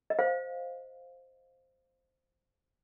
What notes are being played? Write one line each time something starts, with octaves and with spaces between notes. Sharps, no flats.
D#5
C5 F5